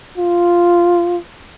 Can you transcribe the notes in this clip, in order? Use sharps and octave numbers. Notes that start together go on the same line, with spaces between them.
F4